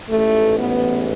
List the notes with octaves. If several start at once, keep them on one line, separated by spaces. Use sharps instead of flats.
A1 G#2 E3 A3
B3